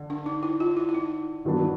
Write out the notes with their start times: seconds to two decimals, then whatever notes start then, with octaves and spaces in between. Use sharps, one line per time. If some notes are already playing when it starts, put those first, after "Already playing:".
Already playing: D3
0.10 D4
0.26 D#4
0.43 E4
0.60 F4
0.77 E4
0.89 E4
0.94 D#4
1.45 G2 D#3 F#3 B3 D4